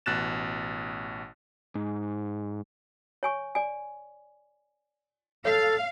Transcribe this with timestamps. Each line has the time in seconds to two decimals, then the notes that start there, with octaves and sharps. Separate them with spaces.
0.06 A1 B2 F#6 A6 E7
1.75 G#2
3.23 C#5 G#5 C#6
3.55 D5 G#5
5.45 A4 C#5 F5